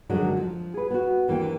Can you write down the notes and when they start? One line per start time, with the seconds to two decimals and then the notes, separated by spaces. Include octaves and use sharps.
0.09 F2 D3 D#3 F#3 G#3 D4
0.37 F3
0.74 G#4 B4
0.91 B3 F#4
1.28 D#2 E3 A#3 D4 G5